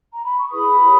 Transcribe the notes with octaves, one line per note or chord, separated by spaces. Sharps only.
A#5
B5
C#6
E4 G#4 B4 B5 D#6
G4 A#4 C#5